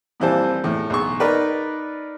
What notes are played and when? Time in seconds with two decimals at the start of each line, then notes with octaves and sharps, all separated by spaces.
0.20 F2 A#2 E3 G3 C5 A5
0.64 E2 A2
0.90 B1 G#4 C#6
1.20 D#4 A#4 B4 D5